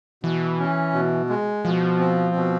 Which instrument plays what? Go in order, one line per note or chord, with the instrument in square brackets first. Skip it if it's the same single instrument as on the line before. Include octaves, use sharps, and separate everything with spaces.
[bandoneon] B2 [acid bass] E3
[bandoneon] C#4
B2
G#3
[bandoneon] B2 [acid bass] F3
[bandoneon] C4
B2